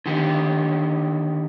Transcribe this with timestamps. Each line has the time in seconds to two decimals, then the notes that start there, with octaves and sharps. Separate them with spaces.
0.06 D3 D#3 G4